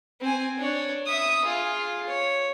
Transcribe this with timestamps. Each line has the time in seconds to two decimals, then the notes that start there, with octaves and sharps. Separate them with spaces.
0.20 C4 G#5
0.58 D4 C#5
1.06 E5 D#6
1.45 F4 G#4
2.06 C#5